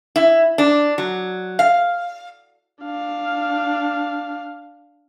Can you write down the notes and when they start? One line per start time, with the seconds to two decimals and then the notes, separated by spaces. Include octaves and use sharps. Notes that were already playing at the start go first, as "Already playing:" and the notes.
0.16 E4
0.58 D4
0.98 F#3
1.59 F5
2.82 D4 F5